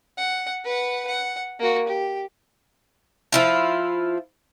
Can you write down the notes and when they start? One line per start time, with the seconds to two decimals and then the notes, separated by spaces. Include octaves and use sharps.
0.18 F#5
0.64 B4 F#5
1.07 F#5
1.59 A#3 F#4
1.87 G4
3.32 F3 E4 F4